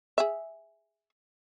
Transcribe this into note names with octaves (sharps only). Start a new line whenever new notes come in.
G#4 E5